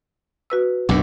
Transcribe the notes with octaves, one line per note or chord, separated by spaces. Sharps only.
F#4 B4 E6
B1 F#2 A2 D4